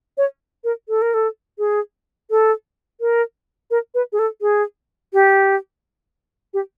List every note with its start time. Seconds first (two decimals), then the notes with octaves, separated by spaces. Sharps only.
0.18 C#5
0.64 A#4
0.89 A4
1.02 A#4
1.14 A4
1.59 G#4
2.30 A4
3.01 A#4
3.71 A#4
3.95 B4
4.12 G#4
4.19 A4
4.41 G#4
5.13 G4
6.54 G4